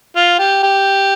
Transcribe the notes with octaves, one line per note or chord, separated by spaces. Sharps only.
F4
G4
G4